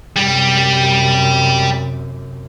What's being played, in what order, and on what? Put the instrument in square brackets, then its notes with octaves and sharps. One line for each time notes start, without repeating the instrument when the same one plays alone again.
[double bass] F#2 C3 [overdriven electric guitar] G3